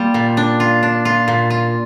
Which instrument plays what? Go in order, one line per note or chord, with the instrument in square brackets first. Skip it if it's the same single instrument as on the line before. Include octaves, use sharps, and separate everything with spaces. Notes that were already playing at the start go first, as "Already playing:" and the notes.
Already playing: [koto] G3 F4 [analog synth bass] A#3
[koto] A#2
D4
F4
D4
F4
A#2
F4